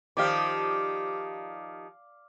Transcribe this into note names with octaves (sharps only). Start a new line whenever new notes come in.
D#3 F3 G4 D5 F5